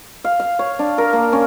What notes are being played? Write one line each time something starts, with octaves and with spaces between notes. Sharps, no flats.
F5
F5
C#5
D4
A#4
A#3
C#4